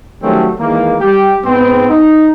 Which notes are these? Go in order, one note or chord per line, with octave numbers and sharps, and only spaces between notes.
D#3 F#3 G3 A3 C4 C#4
D#3 E3 G#3 A#3
G3 G4
G#2 B3 C4
D#4